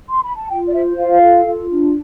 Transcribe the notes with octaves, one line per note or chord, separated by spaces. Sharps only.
C6
B5
A5
F4 G5
D5
C5 E5
F4 F5
A4
F4
D4